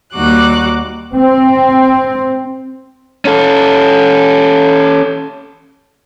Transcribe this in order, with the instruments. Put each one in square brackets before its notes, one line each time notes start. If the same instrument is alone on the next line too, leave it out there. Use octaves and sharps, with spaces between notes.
[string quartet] D#2 G3 D#4 F#4 D6 F#6
[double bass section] C4
[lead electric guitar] C#4 A4